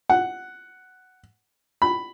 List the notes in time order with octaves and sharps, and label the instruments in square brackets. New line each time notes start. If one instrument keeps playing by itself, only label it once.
[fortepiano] F#5
B5